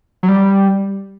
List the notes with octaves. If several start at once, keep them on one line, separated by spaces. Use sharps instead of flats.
F#3
G3